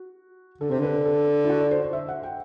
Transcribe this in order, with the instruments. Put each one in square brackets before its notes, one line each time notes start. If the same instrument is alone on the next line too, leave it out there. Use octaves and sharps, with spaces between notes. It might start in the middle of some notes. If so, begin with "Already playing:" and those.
Already playing: [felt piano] F#4
[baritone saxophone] D3 [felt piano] A4
[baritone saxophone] C3 [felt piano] C5
[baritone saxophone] D3 [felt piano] B4
[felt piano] A4
E4
F#4
D5
C5
C5
E5
F#5
G5